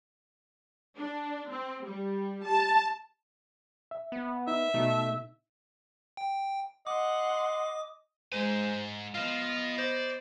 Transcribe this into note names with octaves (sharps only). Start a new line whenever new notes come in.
D4
C4
G3
A5
E5
B3
D#4 E5
B2 A3 D#4
G5
D#5 F#5 C6 D6
G#2 G#3 C5 G#5
B3 F4 C5 D#5 F5
C5 D5